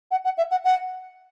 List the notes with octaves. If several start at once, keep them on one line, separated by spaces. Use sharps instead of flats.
F#5
F#5
E5
F#5
F#5